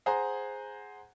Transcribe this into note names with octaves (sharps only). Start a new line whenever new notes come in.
G#4 C5 F#5 G#5 A#5